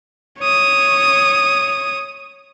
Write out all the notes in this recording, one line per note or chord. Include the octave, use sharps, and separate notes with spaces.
C#5 D#6